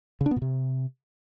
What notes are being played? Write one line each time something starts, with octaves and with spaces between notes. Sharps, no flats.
C#3
D4
B3
A#2
C3